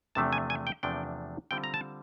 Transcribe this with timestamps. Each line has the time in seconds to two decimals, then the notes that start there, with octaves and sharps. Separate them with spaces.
0.15 E2 C3 F3 A3 D4 A5
0.33 G#5
0.50 G#5
0.67 G5
0.83 E2 C3 F3 A3 D4 G5
1.51 D3 G3 C4 F4 G5
1.64 A#5
1.74 A5